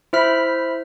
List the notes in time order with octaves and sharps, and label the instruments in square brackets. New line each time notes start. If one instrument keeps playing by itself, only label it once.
[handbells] E4 C5 E5 B5 F6 B6